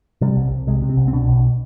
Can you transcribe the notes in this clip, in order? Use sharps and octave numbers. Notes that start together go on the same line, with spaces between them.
C3 G3
C2
C2
C3 G#3
C3
C4
C2
C4
B2 D4
B1